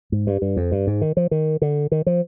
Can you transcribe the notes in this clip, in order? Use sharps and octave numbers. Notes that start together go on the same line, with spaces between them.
G#2
G2
G2
F2
G2
G#2
D#3
F3
D#3
D3
D#3
F3